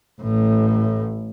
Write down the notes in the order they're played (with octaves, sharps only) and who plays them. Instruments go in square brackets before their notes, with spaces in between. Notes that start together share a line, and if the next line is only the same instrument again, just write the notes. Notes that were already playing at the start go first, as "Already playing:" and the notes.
[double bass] A1 A2